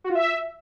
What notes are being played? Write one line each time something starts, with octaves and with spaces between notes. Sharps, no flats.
F#4
F4
E5